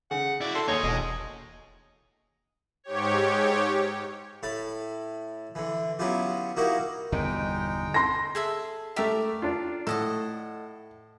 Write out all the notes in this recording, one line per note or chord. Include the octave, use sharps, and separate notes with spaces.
C#3 F#5
E4 F#4 D5
A4 C6
D#2 D#4 G#4 C#5
E1 D#5
G#2 G4 C#5
A2 A5 B5
D3 E3
F#3 B3 C#4 E4 F4 G4
A#3 D#4 E4 F#4 G4 A#4
G1 E2 B2 G#3 D#4 G5
C6 A#6
G#4 A4 E5
A3 G4 A#4 D5 E5
D4 F4
A2 A4 D#5 F#5